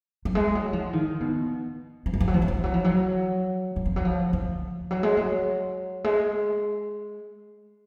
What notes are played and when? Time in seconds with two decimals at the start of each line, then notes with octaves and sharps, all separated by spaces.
0.25 F#3
0.35 G#3
0.55 F#3
0.73 F3
0.93 D#3
1.20 B2
2.06 F3
2.13 F#3
2.20 F3
2.28 F#3
2.34 F3
2.42 F#3
2.48 F3
2.64 F#3
2.74 F3
2.84 F#3
3.76 F#3
3.86 F3
3.96 F#3
4.05 F3
4.33 F3
4.91 F#3
5.03 G#3
5.17 F#3
6.04 G#3